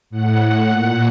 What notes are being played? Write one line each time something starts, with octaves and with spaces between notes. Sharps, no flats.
A2 F#5
A2
A#2